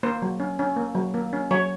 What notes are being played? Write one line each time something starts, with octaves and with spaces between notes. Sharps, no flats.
A#3 C5
F#3
C#4
C#4
A#3
F#3
A#3
C#4
F#3 C#5